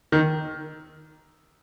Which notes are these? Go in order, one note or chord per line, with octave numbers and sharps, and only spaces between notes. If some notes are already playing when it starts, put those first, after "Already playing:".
D#3